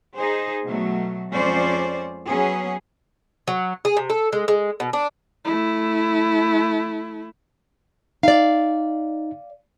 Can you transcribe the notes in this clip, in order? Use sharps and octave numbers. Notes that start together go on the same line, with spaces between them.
D#4 G#4 C5
B2 F#3 A3
F2 G#3 C#4 C5 D5
F#3 B3 C#4 G#4
F#3
G#4
C3
A4
G#3
G#3
B2
D4
A3 E4
D#4 D5 F5